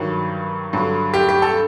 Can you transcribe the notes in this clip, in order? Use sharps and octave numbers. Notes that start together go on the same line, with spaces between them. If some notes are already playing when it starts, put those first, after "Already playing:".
Already playing: G2 D#3 F#3
G2 D3 F#3
G4
G4
A4